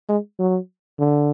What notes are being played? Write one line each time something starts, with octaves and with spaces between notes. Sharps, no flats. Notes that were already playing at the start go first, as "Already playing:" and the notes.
G#3
F#3
D3